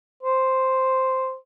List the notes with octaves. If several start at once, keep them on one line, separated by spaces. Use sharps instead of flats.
C5